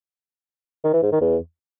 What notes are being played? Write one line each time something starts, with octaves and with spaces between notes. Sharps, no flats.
D#3
E3
G#2
D#3
E2